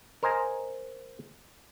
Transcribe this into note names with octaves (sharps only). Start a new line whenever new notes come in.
A#4 C5 D#5 G#5 A#5